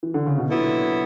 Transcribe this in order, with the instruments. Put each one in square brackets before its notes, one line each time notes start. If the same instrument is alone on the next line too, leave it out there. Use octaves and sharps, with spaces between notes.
[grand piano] E3
D3
C#3
B2
[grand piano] A#2 [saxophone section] D3 F#3 B3 E4